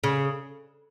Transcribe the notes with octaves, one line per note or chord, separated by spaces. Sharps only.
C#3